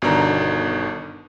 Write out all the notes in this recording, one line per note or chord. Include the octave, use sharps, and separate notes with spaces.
G1 B2 D3 D#3 D4 A#5